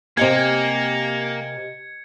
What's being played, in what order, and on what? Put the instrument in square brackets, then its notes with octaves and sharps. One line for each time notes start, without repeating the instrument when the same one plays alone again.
[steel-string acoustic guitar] C3 G#5 [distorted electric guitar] A#3 [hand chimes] G4 D#5 [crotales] G#6 C#7